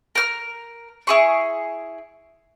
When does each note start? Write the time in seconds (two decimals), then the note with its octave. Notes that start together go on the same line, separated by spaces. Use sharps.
0.15 A#4 F6
1.07 E4 G#4 C#6